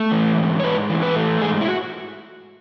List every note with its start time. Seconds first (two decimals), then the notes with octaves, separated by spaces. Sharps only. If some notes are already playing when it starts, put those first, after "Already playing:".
Already playing: A3
0.12 E3
0.38 G#2
0.60 C#5
0.64 G#2 B4
0.89 E3
1.02 B4
1.15 A3
1.42 G#2 G#4
1.61 E4
1.68 F#4